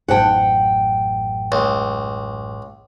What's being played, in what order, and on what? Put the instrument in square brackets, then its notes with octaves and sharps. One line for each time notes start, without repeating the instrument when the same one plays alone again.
[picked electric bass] A1 F#2 [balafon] D#4 C5 A5 [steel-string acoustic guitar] F#5 G5
[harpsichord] C#2